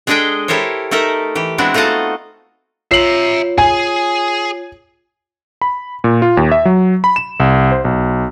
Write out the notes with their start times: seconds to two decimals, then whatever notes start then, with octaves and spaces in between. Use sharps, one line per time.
0.07 G#3 D4 G#4 A4 D#5 G5
0.48 E4 G4 A4 A#4 C5 C#5
0.91 A3 D#4 A4 A#4 E5
1.35 E3 G4
1.58 G#3 B3 C4 D4 E4 F#4
1.74 A3 D#4 F4 F#4 D#5 A5
2.91 F4 C#5 E5 A#5 C7 F#7
3.58 G#4 G#5
5.62 B5
6.04 A#2
6.22 F4
6.37 D#2
6.51 E5
6.65 F#3
7.04 B5
7.16 E7
7.40 C2
7.72 C5
7.85 B1